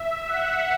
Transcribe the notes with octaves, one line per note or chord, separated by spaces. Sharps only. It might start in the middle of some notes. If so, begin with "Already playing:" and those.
Already playing: E5
F#5